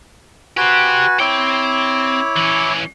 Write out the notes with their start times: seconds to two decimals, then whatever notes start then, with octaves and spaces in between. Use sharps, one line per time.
0.57 F#4 G4 B4 C5 G#5
1.20 C4 E4 C#5 G5 D6
2.37 E3 C#4